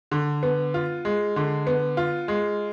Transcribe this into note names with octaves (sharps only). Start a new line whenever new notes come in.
D3
B3
F4
G#3
D3
B3
F4
G#3